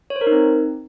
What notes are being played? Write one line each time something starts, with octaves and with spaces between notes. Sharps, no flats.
C#5
C5
A#4
D#4
C4